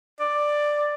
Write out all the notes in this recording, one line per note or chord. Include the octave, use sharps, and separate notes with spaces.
D5